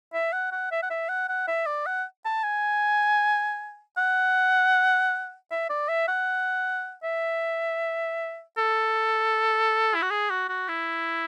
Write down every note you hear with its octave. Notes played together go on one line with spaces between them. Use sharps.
E5
F#5
F#5
E5
F#5
E5
F#5
F#5
E5
D5
F#5
A5
G#5
F#5
E5
D5
E5
F#5
E5
A4
E4
F#4
G#4
F#4
F#4
E4